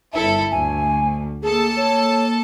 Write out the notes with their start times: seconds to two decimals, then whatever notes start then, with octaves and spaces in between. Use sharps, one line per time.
0.13 G1 E4 A4 E5
0.52 D2 G#5
1.42 A#3 G#4 A4 A5
1.77 C#5